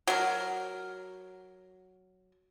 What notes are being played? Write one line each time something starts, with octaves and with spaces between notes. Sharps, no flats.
F#3 A#4